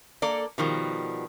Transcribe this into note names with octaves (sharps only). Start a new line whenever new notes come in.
A#3 A4 D5
B2 D#3 F3 G3